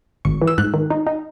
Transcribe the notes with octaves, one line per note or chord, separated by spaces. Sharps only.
G#1 C#6
E3
E6
G#2 F#6
D#3
D#4
D#4